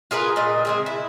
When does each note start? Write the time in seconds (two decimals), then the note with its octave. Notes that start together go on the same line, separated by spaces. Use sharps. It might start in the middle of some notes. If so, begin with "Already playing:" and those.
0.11 F4 G#4 A#4 B4
0.36 A#2 D#5
0.65 G#3 C4 G#4
0.86 E4